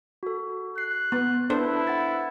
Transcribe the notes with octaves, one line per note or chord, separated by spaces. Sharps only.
F#4 A4
F#6 C7
B3
D4 E4 A4 B4 C5
F#5 A6